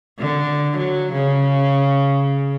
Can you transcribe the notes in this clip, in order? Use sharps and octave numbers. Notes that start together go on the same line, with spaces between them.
D3
F#3
C#3